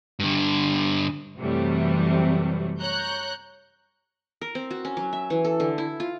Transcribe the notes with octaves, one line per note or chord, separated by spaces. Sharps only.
G2 D3
F#2 C3 E3 F#3 G3 A3
C#5 A#5 F#6 G6
A#4
C4
F#4
C#4
F#3
E5
E3
A4
D3
E4
F4